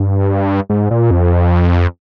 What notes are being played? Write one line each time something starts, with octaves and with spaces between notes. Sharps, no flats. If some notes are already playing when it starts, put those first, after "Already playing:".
Already playing: G2
G#2
A#2
F2